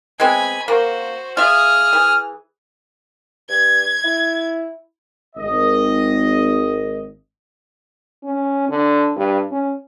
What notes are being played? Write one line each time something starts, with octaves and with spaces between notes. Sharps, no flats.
G#3 B3 C4 G#5 B5
A#3 F#4 C5
F4 G#4 E5 D#6 F6
E3
G2 G#6
E4
G#1 D#5
C#4
D3
G2
C#4